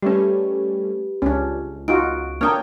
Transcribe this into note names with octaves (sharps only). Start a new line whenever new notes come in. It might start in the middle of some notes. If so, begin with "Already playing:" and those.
G3 A3 C#4 G4 B4
C#2 C#4 D4
D#4 F4 F#4 D7
A#3 D4 C#5 G5 A#5 D#6 F6